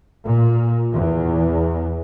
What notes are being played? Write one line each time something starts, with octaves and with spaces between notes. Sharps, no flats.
A#2
E2